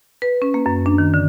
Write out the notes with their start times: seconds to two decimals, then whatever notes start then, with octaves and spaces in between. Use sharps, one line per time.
0.22 B4
0.42 C#4
0.54 A#3
0.66 F#2
0.86 D4
0.98 D#3
1.14 D3